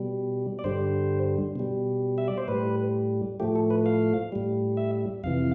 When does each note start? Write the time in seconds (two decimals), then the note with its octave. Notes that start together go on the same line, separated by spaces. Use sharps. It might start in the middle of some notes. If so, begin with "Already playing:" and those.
Already playing: B2 G3
0.59 D5
0.64 G2 D3 G3 C5
1.56 B2 G3
2.18 E5
2.28 D5
2.38 C5
2.48 A2 G3 B4
3.40 A2 F3 A3 G4
3.55 A4
3.70 B4
3.86 F5
4.32 A2 G3
4.77 E5
5.24 F2 C3 E3 F5